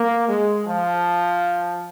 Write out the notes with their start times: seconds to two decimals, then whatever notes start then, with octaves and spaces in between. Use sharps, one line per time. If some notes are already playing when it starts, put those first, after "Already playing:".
Already playing: A#3
0.28 G#3
0.67 F3